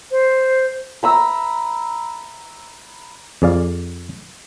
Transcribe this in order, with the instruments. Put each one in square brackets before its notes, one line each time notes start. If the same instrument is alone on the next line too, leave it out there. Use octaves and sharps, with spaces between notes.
[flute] C5
[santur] B4 A#5 E6
[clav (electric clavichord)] F2 G#4 D5 F5